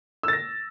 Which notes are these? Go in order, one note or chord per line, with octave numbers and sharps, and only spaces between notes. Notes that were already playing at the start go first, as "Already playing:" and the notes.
E6 A6 A#6